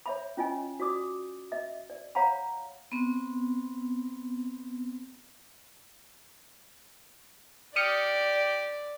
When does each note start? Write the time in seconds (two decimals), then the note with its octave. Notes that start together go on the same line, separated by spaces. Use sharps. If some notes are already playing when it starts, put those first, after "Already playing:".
0.06 C#5 E5 B5
0.37 C#4 F4 D#5 G#5
0.80 F#4 D5 D6 D#6
1.52 D#5 E5
1.90 D5
2.15 C#5 F5 F#5 A#5 B5
2.92 B3 C4
7.76 G4 D5 D#6 F6 C#7